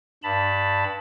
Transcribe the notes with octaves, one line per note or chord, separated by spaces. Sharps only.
G2 A5 B5